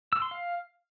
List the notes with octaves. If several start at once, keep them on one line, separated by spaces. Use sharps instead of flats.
E6
C6
F5